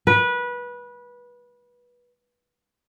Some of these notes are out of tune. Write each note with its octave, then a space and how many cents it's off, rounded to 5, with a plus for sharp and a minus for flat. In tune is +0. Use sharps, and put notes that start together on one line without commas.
B4 -20